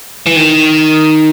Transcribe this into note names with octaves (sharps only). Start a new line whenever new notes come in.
E3
D#3